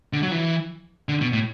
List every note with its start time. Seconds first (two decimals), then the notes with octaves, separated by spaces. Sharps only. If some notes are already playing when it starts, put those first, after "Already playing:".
0.13 D3
0.23 F#3
0.31 E3
1.09 D3
1.21 B2
1.33 A2